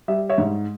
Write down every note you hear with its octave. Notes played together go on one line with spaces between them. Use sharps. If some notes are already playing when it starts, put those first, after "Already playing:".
G3 E5
C#5 E5
G#2